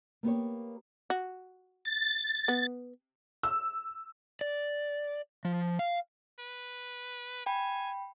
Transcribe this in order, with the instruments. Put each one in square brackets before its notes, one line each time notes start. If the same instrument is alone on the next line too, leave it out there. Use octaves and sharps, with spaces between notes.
[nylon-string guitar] A#3 B3 G4 C#5
[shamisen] F#4
[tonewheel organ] A6
[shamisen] B3
[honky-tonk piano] E6
[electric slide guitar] D5
F3
F5
[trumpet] B4
[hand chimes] G5 B5 [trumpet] G#5